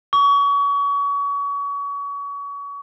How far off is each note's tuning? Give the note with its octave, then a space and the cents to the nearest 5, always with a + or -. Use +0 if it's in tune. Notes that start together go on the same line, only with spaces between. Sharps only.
C#6 +35